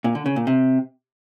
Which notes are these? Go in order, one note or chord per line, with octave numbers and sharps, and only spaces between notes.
A#2
D3
C#3
A#2
C3